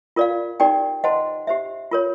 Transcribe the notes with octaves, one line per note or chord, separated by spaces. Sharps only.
F4 A#4 D5 F5
D#4 G4 A#4 D5 G5
C5 D#5 F#5 A5 C6
G4 C5 E5
F4 A#4 C#5